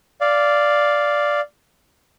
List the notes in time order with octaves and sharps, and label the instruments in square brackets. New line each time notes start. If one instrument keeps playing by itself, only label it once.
[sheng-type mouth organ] D5 F5